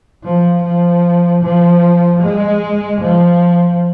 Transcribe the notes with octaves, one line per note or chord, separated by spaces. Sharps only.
F3
F3
F3
G#3
F3